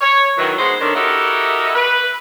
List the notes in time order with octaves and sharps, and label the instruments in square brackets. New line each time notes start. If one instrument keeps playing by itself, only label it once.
[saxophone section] C#5
D#3 E3 F#3
G#3 B3 D#4 G#4 C5
D#3 A3 C#4 D4
E4 F#4 G4 A4 A#4 D#5
B4